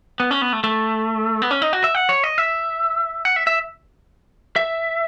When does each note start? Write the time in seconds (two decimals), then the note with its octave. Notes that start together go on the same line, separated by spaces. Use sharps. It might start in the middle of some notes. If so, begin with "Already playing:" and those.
0.20 B3
0.31 C#4
0.42 B3
0.53 A3
0.64 A3
1.42 B3
1.51 C#4
1.62 D#4
1.73 F#4
1.84 E5
1.95 F#5
2.09 C#5
2.24 D#5
2.38 E5
3.25 F#5
3.36 E5
3.47 E5
4.56 E5